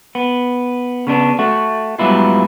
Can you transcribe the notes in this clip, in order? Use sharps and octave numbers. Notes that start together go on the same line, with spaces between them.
B3
C#3 B3 D4
A3 F#4
G#2 F#3 G3 B3 E4 F4